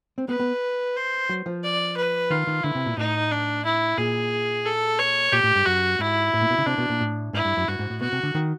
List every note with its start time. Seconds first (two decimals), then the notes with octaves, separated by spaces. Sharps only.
0.18 C4
0.29 B3 B4
0.40 B3
0.96 C5
1.29 F#3
1.46 F3
1.63 D5
1.97 B4
2.30 D#3 F4
2.47 D#3
2.63 D3 E4
2.75 C3
2.86 A#2
2.97 A2 D#4
3.31 D4
3.65 E4
3.98 A#2 G#4
4.65 A4
4.99 C#5
5.32 A#2 G4
5.44 A2
5.55 G2
5.65 F#2 F#4
5.99 G#2 E4
6.34 A2
6.41 A#2
6.50 B2
6.58 C#3
6.66 C3 D4
6.78 B2
6.89 A#2
7.00 A2
7.33 G#2 E4
7.45 G2
7.57 F#2
7.68 G2 F#4
7.79 G#2
7.90 A2
8.01 B2 F#4
8.12 C3
8.23 D3
8.34 D#3